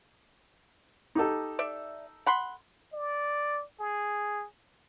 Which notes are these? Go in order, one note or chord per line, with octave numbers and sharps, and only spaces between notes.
D#4 G4 A4
D5 E5
F#5 B5 C6
D5
G#4